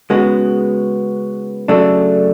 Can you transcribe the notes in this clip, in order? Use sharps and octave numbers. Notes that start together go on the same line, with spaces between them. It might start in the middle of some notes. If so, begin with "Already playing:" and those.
C#3 G#3 B3 F#4
C#3 F#3 A3 D4